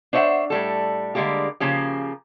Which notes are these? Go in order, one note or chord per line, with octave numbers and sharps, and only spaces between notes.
D4 C5 C#5 D#5 E5 F#5
A2 G3 A4
D3 G3 G#3 A#3 G4
C#3 F3 A#3 C#4 G4